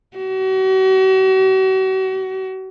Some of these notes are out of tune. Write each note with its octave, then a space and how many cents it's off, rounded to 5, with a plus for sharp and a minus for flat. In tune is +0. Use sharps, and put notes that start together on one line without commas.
F#4 +40